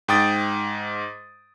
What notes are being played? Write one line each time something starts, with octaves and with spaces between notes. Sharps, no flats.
G#2 G5 D#6 A6 D7